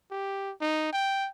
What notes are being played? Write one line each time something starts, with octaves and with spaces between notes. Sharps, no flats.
G4
D#4
G5